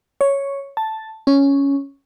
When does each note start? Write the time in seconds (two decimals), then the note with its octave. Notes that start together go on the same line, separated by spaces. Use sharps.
0.21 C#5
0.77 A5
1.27 C#4